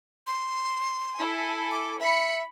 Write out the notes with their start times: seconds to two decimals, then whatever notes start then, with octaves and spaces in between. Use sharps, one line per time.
0.27 C6
1.16 E4 A4 G#5
1.71 D6
2.00 E5 B5 C#7